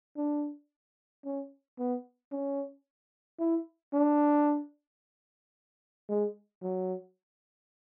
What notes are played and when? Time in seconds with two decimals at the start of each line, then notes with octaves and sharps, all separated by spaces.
0.17 D4
1.25 C#4
1.79 B3
2.32 C#4
3.40 E4
3.94 D4
6.09 G#3
6.63 F#3